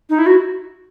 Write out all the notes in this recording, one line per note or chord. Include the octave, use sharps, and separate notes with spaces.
D#4
E4
F#4